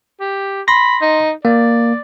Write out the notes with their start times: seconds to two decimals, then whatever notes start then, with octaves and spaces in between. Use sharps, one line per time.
0.20 G4
0.68 B5 C6 A#6
1.01 D#4
1.45 A#3 D5